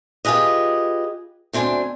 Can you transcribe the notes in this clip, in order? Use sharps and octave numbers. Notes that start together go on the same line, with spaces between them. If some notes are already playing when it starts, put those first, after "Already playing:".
F4 G4 G#4 B4 D#5
D2 C4 D4 G#5